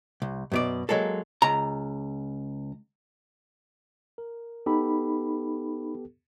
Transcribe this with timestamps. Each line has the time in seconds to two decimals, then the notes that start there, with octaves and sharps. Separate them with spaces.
0.22 C2
0.52 F#2 B2 D5
0.89 F#3 G#3 A#3 A4
1.42 C#2 A#5
4.18 A#4
4.66 B3 D#4 G4 A4 B5